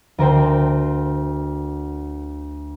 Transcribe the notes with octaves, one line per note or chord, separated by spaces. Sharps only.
D2 A#4 C5 G5